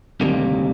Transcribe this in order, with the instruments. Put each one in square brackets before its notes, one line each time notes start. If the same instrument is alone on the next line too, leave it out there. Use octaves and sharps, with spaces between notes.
[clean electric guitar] D2 C3 D#3 G3 A#3